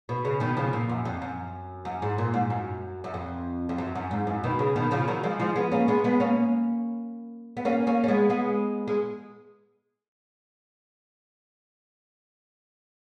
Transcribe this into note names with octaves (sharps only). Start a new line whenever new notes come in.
B2
C#3
B2 D#3
C#3 F3
A#2
F#2
F2
F#2
F#2
G#2
A#2
G#2
F#2
F#2
F2
F2
F#2
F#2
G#2
F#2
B2 D#3
C#3
B2 D#3
C#3 F3
D#3 F#3
F3 G#3
F3 G#3
G#3 B3
A#3 C#4
G#3 B3
G#3 B3
A#3 C#4
B3
A#3 C#4
A#3 C#4
C#4
G#3 B3
G#3 B3
G#3